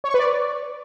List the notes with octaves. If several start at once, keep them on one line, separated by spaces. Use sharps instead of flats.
C#5
C#6
B4
D5